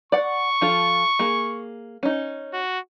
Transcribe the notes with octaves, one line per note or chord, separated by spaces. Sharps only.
D5 F#5 C#6
F3 F4 A4
A#3 G#4
C#4 D#4
F#4